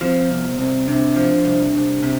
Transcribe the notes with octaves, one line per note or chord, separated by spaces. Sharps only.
F3 C4
C2 B3
C2 C4
C3 D4
F3
C2
C2
C3